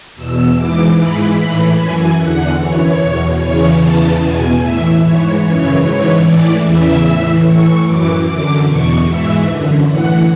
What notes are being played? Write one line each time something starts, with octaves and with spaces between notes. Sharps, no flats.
E2 B2 E6
G#2 E3 D6
G#2 E3 B5
A2 E3 B5
F#2 E3 G#5
E2 D3 F#5
F#2 E3 C#5
E2 B2
E2 C#3 E3 C#5
E2 C#3 E3 A5
E2 B2 G#5
A2 E3 E5
G#2 E3 C#5
F#2 C#3 E3 C#5
G#2 E3 C#5
A2 E3 D5
E2 C#3 E3 E5
A2 E3
A2 E3 C#6
F#2 E3 D6
F#2 D3 D6
E2 B2 C#6
G#2 E3 E5
F#2 D3
A2 E3 F#5